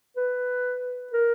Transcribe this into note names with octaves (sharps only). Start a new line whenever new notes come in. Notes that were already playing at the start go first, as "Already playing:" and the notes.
B4
A#4